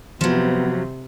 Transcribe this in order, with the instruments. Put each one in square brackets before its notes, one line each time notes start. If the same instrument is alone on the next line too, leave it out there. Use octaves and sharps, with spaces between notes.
[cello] C3 [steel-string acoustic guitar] F3 F#3 [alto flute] B3